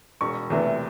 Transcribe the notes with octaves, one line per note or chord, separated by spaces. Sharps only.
E1 C#6
E2 C3 E3 A3